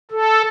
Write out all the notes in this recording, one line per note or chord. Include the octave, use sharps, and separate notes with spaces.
A4